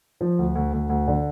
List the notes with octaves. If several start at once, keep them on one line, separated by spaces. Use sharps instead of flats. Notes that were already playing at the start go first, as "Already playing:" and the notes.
F3
D2
D2
D2
D2
D3